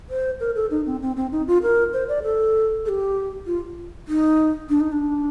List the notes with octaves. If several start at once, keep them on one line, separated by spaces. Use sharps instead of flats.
C5
A#4
A4
D#4
C4
C4
C4
D#4
F4
A#4
C5
D5
A4
A4
G4
F4
D#4
D4
D#4
D4